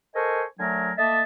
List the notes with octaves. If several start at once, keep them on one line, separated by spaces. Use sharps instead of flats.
A4 A#4 C5 D#5 G#5 C#6
D3 F#3 A3 D4 A#4 G#5
A3 A#3 D#5 E5 A5